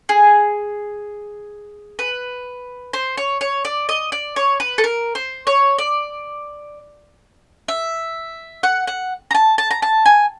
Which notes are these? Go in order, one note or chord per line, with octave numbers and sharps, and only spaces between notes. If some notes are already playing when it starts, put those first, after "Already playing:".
G#4
B4
C5
C#5
C#5
D5
D#5
D5
C#5
B4
A4
A#4
C5
C#5
D5
E5
F#5
F#5
A#5
A5
A5
A#5
A5
G#5